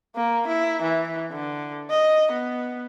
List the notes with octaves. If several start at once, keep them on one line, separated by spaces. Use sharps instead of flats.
A#3
E4
E3
D3
D#5
B3